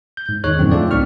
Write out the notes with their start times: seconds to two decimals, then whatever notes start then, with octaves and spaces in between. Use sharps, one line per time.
0.17 G6
0.29 G#2
0.44 E2 D#3 D#4 G#4 C#5 F#6
0.59 F#2 A2 D3 F3 C4
0.71 A3 D#4 F4 A4 D5 G5
0.91 C2 G#2 C4 D4 C#6 F6